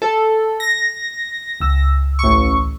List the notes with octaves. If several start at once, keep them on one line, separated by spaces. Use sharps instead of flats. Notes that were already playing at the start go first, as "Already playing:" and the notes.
A4
A#6
C#2 E6
A1 C#6